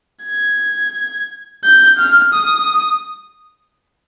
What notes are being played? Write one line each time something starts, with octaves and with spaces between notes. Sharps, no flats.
G#6
G6
F6
D#6